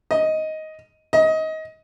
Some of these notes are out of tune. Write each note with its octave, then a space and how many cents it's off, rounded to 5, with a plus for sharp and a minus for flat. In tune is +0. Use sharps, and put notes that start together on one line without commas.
D#5 +10
D#5 +25